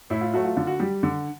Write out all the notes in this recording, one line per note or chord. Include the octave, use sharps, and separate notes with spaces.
A2 E4
F4
F#3 A3 F#4
F4
D3 F4
F#4
G3 G4
D3